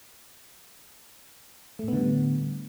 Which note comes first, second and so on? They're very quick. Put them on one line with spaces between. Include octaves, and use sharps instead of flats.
A3 A2 B3 D3 G3